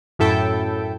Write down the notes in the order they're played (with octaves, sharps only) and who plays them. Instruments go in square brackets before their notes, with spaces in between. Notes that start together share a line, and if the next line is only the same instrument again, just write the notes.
[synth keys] F#2 A2 E4 A4 G5